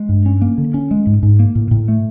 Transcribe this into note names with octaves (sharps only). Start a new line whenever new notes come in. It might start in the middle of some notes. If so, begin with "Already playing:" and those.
Already playing: G#3
G2
C#4
A#3
D3
C#4
G#3
G#2
G#2
A#3
A2
A2
A3